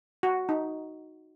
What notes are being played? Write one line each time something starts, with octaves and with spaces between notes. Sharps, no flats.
F#4
D#4